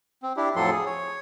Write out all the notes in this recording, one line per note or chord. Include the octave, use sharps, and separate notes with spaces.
C4
D4 E4 G4
F2 A2 F3 F#3 A4 C6
G#4
C#5